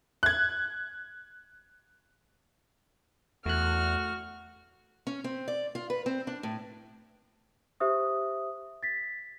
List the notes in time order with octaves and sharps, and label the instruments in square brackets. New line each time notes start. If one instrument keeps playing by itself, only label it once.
[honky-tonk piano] F#6 G#6
[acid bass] E2 [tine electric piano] A3 F#6 [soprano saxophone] F#4 [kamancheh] F6
[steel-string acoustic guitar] C#4
C4
D5
F4
B4
C4
D4
A2
[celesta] G4 C5 E5 D#6
A6 B6